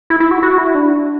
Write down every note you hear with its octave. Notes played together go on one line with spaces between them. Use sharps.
E4
E4
F#4
F#4
E4
D4